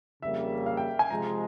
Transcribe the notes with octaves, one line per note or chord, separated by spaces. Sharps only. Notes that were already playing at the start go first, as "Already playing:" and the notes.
F2 C#3 G3 A#3 E5
F5
G5
G#5
C3 F3 G#3 A#5